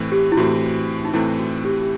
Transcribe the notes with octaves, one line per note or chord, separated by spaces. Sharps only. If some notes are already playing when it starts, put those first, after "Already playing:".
Already playing: A2 E3 A3 C4
G4
E4
A2 E3 A3 C4 F#4
D#4
A2 E3 A3 C4 E4
F#4
G4
G4